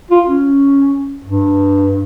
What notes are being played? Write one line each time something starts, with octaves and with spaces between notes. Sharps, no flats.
F4
C#4
G2